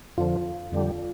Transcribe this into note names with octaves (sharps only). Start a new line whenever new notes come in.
F2 D3 F3 F4
F2 D3 G3